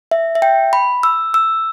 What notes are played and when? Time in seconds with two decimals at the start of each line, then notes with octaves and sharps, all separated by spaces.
0.11 E5
0.35 E5
0.42 G5
0.73 B5
1.03 E6
1.34 E6